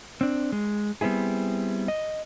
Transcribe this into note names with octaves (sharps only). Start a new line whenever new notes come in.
C4 D4
G#3
G3 B3 C4 E4 G#4
D#5